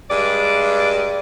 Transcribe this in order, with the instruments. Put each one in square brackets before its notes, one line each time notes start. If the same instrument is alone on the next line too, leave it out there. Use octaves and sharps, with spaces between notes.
[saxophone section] G2 G#3 D5